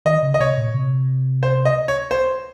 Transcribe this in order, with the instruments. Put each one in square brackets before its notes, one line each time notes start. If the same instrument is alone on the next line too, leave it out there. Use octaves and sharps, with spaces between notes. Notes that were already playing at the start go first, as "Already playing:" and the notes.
[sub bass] D#3 [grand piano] D#5
[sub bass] C#3
[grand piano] D#5
[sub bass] C3 [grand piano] C#5
[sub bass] A#2
C3
[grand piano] C5
D#5
C#5
C5